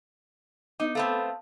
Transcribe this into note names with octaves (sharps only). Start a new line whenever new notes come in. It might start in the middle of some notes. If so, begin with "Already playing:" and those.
B3 D#4 D6
A3 B3 C4 F5 A5